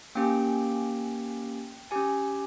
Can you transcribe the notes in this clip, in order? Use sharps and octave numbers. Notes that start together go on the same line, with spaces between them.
A#3 C#4 G4 G5
C#4 G4 G#5